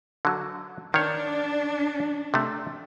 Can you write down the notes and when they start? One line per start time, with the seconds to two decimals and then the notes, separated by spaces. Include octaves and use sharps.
0.25 D3 F#3
0.94 D#3 D4 C#5
2.34 C3 A3